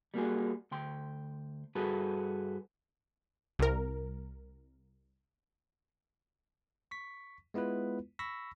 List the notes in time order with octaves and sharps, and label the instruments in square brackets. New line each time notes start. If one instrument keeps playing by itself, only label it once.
[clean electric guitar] G3 A#3 F#4 G#4
D2 G5 C6
G2 F#4 G#4 A4 B4
[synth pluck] C2 A#4
[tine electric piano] C#6 B6
G#3 B3 E4 F4 B4
B5 C#6 E6 A#6 B6